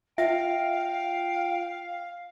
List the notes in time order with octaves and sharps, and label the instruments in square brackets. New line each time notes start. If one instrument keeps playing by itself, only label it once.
[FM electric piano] F4 [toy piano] E5 [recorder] F5 [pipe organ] G5